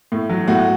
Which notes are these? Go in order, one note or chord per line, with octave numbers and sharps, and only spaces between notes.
A2
F#3
A2 F#4